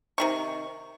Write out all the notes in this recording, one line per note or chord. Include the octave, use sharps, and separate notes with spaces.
C3 D#3 C#6